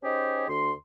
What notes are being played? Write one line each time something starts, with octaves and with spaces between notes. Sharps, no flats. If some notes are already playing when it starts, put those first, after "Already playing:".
C#4 D#4 G4 G#4 C5
D2 C6